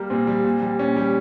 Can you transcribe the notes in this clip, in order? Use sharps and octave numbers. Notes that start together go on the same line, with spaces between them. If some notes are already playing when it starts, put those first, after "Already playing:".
Already playing: G3 A#3
A#2 C4
G3
A#2
G3
A#2 C#4
G3